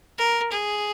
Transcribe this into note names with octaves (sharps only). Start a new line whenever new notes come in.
A#4
G#4